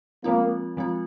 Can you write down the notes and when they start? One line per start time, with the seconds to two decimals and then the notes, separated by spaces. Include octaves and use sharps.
0.24 F3 G#3 A#3 C4 F4
0.77 F3 G#3 C4 F4